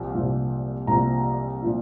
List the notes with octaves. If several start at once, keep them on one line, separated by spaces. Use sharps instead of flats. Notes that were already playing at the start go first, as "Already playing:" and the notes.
Already playing: C2 A#2 F3
C2 A#2 F3
C2 A#2 F3 A#5
A#2 F3